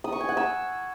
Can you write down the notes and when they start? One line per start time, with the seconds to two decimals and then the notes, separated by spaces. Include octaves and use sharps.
0.04 D#6
0.12 C#6
0.21 G#5
0.29 F#5
0.37 E6